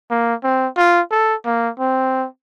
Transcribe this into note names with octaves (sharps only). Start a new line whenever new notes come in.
A#3
C4
F4
A4
A#3
C4